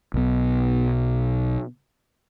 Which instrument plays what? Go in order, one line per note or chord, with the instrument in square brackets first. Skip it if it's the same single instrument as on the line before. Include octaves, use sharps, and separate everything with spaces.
[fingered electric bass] B1 B2